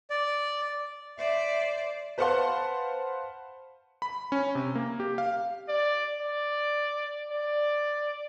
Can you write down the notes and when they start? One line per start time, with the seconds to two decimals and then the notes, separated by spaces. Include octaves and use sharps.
0.10 D5
1.18 C5 D5 E5
2.18 B4 C5 F5 F#5 A5 C6
4.02 B5
4.32 C#4
4.55 C3
4.75 A#3
5.00 G4
5.18 F5
5.69 D5
6.20 D5
7.31 D5